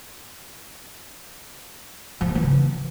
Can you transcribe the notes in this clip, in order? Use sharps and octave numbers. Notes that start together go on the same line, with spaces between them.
F3
A#3
E3
C#3